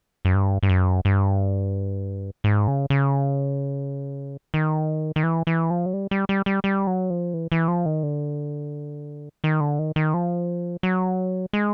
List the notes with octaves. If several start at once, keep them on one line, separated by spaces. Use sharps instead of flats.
F#2
G2
G2
F#2
G2
G#2
C#3
C#3
D#3
D#3
E3
E3
F3
F#3
G3
G3
G3
G3
G3
F#3
F3
E3
E3
F3
D#3
D3
D#3
D3
D#3
D#3
F3
F#3
G#3